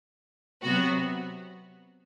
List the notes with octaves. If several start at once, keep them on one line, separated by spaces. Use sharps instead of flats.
C3 F#3 B3 F#4